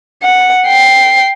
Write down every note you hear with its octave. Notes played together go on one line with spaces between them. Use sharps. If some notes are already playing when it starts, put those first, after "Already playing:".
F#5
G5 C7